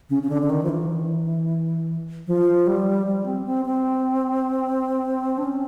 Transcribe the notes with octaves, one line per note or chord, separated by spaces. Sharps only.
C#3
C#3
D3
D3
D#3
F3
E3
F3
G3
G3
C4
C4
C4
D4
C#4